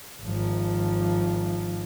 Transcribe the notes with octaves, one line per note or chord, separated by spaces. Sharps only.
G#1 F3